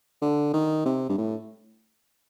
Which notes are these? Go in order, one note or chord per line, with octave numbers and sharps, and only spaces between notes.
D3
D#3
C3
G2
A2